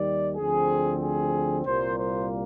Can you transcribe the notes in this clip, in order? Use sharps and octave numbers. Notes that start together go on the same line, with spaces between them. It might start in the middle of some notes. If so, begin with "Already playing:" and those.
Already playing: D#2 D#3 G3 D5
D2 D3 F3 C4 G#4
G#4
C2 A#2 G3 A#3 C5
C5